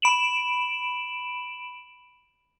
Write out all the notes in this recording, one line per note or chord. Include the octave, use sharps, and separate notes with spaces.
B5 D7 E7 F#7